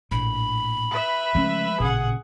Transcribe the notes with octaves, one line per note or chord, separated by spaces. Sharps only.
A#1 A2 B5
B4 E5
C#3 F3 G#3 A3 C#4
A1 A#2 C#3 G#4 F#5